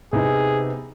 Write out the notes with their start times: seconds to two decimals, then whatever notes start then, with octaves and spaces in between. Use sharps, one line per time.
0.13 C3 B3 D#4 G#4